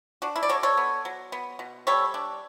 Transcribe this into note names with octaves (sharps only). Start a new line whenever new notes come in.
D4 F#4
E4
D5
F#3 A4 C#5
A4 C#5
B3
F#3
B3
B2
G3 A4 C#5
D4